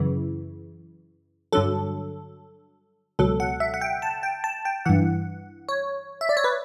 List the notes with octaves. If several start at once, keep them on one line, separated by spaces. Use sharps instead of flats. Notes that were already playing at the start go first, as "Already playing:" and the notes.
Already playing: F#2 C#3 E3
G2 D3 F#3 A4
C#2 B2 F#3 A4
F#5
E5
F#5
G5
A5
G5
A5
G5
G2 E3 F#5
C#5
E5
D5
C#5
B4